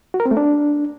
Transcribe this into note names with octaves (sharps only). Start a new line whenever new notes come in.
F#4
A#4
C4
A3
D4